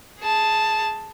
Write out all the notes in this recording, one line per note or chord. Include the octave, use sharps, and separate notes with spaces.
G#4 A5